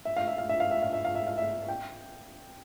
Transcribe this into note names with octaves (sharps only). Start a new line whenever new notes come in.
E5
F5
E5
F5
E5
F5
E5
F5
E5
F5
E5
F5
E5
G5